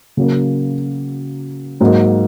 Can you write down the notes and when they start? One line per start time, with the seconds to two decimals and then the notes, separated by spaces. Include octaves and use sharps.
0.17 C#3 F#3 A#3
1.81 G#2 F#3 A#3 D#4